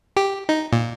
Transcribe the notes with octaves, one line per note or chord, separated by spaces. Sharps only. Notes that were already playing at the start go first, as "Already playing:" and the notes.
G4
D#4
A#2